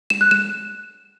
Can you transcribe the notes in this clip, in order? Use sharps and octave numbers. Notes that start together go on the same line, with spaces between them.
E7
F#6
E7